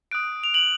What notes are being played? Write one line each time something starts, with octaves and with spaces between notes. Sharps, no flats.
D#6 F#6 D7
F7
F#7